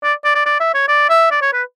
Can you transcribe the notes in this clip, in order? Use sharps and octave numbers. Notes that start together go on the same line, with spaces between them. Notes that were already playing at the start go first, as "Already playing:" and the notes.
D5
D5
D5
D5
E5
C#5
D5
E5
D5
C#5
B4